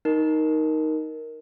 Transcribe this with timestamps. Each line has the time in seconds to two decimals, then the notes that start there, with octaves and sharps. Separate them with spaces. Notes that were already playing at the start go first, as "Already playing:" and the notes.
0.05 D#4 A#4